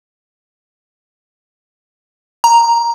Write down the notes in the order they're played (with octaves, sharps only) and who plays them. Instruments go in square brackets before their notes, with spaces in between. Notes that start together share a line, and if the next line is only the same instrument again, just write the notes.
[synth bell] A#5